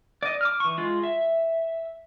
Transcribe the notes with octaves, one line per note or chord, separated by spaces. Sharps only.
D5 D#5
D6 F6
E3 C#6
G#3 F4
E5